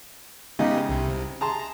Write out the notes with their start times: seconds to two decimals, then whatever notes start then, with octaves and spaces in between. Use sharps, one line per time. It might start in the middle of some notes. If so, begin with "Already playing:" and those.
0.59 C#3 G#3 B3 D#4 G4 D#5
0.89 C2 C3
1.41 G#4 A5 A#5 C6